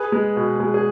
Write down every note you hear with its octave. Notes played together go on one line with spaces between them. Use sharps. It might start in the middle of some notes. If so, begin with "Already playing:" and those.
Already playing: G#4 B4
G#3
B2
G#3
G#4